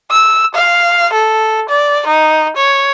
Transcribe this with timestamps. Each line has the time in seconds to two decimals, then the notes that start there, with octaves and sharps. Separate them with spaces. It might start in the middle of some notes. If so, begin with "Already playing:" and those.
0.11 E6
0.55 F5
1.13 A4
1.69 D5
2.07 D#4
2.57 C#5